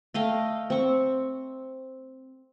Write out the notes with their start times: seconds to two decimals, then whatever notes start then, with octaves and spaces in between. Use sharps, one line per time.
0.14 A3 D#5 F5 G5
0.70 C4 C#6